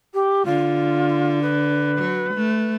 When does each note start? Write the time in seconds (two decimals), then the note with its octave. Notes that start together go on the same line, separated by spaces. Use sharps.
0.13 G4
0.45 D3 F4
1.42 B4
1.98 F#3
2.34 A3